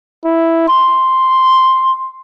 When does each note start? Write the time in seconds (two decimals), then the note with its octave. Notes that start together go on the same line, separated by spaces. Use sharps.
0.25 E4
0.69 C6